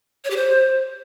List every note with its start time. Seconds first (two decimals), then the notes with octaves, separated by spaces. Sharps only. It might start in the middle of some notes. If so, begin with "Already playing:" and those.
0.25 C#5
0.30 G4
0.36 C5